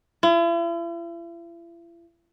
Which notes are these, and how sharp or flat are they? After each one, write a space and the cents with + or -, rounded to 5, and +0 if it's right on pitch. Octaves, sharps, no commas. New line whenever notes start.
E4 +45